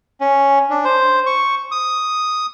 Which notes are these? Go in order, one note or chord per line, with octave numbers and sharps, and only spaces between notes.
C#4
D4
C5
C#6
D#6